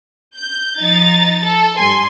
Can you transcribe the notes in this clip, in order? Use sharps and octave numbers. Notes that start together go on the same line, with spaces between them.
G6
F3 D#4 A#5 A6
A4
G2 G#5 C6